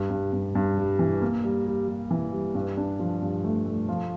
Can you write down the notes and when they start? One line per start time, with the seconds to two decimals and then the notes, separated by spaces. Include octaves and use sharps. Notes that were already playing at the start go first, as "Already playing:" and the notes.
Already playing: G2
0.10 G2
0.33 G2
0.55 G2
0.78 G3
0.99 E3
1.22 A#3
1.44 G3
1.67 G3
1.88 G3
2.11 E3
2.33 G3
2.55 G2
2.77 D4
3.00 F3
3.22 G2
3.44 A3
3.66 A3
3.89 F3